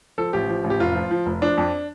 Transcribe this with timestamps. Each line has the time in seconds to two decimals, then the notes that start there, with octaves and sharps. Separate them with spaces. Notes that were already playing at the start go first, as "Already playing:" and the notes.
0.18 F3 A4
0.33 A1 G4
0.48 F3
0.64 A1
0.70 G4
0.80 F1 F4
0.95 F3
1.11 F3
1.26 F1
1.42 F3 D4
1.58 F2